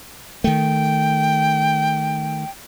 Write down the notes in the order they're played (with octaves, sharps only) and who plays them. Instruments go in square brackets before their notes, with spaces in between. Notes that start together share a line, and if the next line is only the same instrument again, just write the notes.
[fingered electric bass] D#3 A3 [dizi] G5